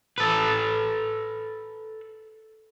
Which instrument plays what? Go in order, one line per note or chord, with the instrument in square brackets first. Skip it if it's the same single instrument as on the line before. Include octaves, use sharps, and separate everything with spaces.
[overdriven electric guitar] A4 B4